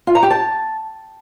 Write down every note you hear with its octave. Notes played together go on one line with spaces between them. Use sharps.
F4
A#5
G4
A5